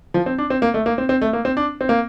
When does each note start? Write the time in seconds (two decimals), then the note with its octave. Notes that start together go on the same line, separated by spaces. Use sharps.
0.14 F3
0.26 C4
0.38 D4
0.50 C4
0.62 A#3
0.74 A3
0.86 A#3
0.98 C4
1.09 C4
1.21 A3
1.33 A#3
1.45 C4
1.57 D4
1.81 C4
1.89 A#3